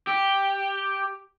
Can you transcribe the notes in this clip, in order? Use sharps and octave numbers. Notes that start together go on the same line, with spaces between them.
G4